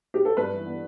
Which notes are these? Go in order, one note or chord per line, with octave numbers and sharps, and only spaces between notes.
G4
A4
G2 B4
E3
B3